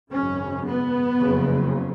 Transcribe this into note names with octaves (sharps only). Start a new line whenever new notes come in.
G#1 F#2 C#3 C#4
B3
F#1 F2 C#3